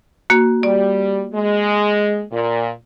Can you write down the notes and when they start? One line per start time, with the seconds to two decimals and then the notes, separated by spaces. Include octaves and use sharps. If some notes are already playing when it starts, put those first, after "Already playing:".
0.30 A#3 F#4
0.63 G3 D5
1.34 G#3
2.32 A#2